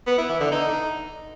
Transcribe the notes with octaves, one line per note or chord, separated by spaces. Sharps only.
B3
E4
E3
D3
D#4